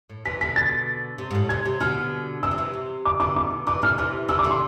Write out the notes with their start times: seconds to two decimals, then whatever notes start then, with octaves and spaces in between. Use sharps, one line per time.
0.10 A2
0.25 C3 E3 B6
0.41 B2 D3 B6
0.56 A6
1.18 C3
1.31 G#2
1.35 A2
1.49 C3 G#6
1.65 C3
1.80 B2 D3 F6
2.43 C3 E3 E6
2.51 F3
2.58 C3 E3
2.73 C3
3.05 D6
3.20 B2 D3 D6
3.36 D6
3.67 C3 E3 D6
3.82 B2 D3 F6
3.98 C3 E3 F6
4.28 C3 E3 E6
4.39 D6
4.44 B2 D3
4.50 C6